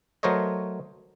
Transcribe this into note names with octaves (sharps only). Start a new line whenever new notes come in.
F#3 A3 A#4 C5 C#5 D#5